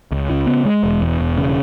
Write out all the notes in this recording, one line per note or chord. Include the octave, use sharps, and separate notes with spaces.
C#2
C#3
B3
G#3
E1
E2
E1
C#3